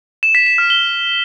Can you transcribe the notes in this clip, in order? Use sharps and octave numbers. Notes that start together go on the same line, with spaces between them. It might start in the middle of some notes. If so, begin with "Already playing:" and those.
E7
B6
E7
F6
G7